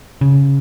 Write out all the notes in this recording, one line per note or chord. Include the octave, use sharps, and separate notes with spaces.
C#3